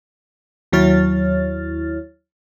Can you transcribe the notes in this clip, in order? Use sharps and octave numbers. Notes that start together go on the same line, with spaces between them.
D#2 F#3 E4 C#5 F6 A6